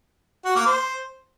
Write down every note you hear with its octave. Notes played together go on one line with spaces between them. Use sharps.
F#4
A#3
C5